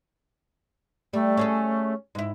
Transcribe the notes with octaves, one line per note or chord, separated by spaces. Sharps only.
G3 A3
C#4 G#4 A4
G#2 E4